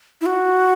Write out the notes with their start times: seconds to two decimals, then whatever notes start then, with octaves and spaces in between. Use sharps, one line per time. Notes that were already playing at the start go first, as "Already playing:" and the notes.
0.21 E4
0.26 F#4